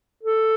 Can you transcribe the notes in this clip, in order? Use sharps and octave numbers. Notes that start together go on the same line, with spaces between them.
A4